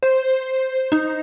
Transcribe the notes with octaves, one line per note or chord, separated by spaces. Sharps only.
C5
D#4